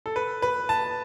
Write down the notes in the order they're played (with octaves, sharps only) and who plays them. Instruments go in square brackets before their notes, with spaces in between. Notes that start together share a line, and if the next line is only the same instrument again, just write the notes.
[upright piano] A4
B4
B4
A5